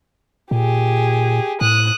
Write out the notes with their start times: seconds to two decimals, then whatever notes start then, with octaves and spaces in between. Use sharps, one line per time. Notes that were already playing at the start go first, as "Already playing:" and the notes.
0.51 A#2 G4 G#4
1.61 A2 D#6 F#6